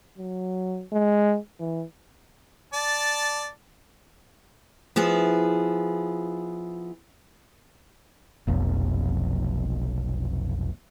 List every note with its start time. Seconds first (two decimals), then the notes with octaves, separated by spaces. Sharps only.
0.18 F#3
0.92 G#3
1.60 E3
2.73 D5 A5
4.96 F3 B3 E4 G#4
8.47 F1 B1 F2